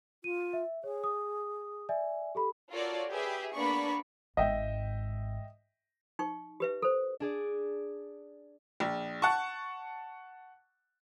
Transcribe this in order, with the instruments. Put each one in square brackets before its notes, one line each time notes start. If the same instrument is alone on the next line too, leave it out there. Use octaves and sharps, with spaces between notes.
[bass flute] F4 [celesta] D#7
[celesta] E5
[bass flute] G#4 [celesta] C#5
[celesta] D#6
D5 E5 G#5
G4 A4 B5
[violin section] F4 F#4 A4 A#4 C#5 D5
G4 G#4 B4 E5
A#3 B3 D4 D5 B5 C#6
[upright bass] G#1 G#2 [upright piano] D#5 E5 G5
[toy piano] D#4 G5 C#6
G4 B4 E5
A4 C5
[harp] D4 G#4 D5
[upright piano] A#1
F#5 A5 C#6